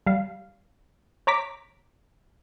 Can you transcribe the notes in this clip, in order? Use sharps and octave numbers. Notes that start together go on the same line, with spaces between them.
G3 F5
C#5 A#5 D6 B6